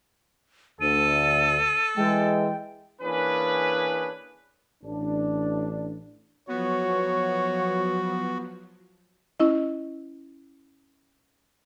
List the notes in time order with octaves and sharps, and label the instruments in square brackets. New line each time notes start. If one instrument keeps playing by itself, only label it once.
[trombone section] D2 [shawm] A4 [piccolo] D#7
[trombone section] E3 G#3 [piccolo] G5
[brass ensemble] E3 A#3 C#4 D4 G#4 B4
A1 D4
[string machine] F3 F#3 [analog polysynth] B3 [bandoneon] F#4 [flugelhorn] C#5
[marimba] C#4 E4 D#5